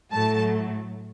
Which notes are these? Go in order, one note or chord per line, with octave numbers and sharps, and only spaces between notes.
A2 F#3 A3 A5